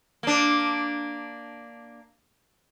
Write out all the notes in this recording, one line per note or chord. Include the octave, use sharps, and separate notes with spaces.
A#3 D4